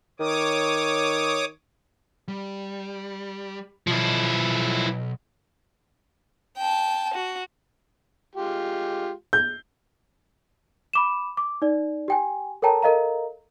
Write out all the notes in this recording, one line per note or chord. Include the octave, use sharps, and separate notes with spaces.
D#3 C#5 D6 D#6
G3
B1 F3 E4
G5 A5
F#4
G#3 F4 G4
G6
B5 D6 E7
D6
D#4 D5
G4 G5 G#5
A4 A#4 C#5 G5 A5 A#5
A4 A#4 D#5 F5 A#5